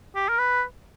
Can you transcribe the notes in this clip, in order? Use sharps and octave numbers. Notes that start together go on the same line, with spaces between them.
G4
A#4
B4